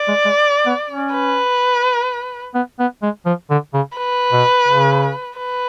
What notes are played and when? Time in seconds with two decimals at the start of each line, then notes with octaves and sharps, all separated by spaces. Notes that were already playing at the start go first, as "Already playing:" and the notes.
Already playing: D5
0.08 G#3
0.25 G#3
0.66 B3
0.90 C#4
1.14 B4
2.55 B3
2.79 B3
3.02 G#3
3.26 F3
3.50 D3
3.74 C#3
3.97 B4
4.32 B2
4.68 C#3
5.38 B4